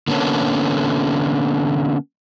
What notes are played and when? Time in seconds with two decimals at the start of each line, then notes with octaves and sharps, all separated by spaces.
0.08 D3 A#3 B3 C#4 A4